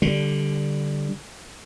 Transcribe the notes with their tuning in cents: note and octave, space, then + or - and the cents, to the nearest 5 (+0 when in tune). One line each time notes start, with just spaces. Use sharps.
D3 +0 G3 +0